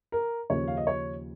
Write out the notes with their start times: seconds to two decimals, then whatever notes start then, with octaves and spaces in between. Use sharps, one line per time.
0.12 A#4
0.50 D#2 C#3 F3 C#5
0.68 F5
0.77 D#5
0.87 C#5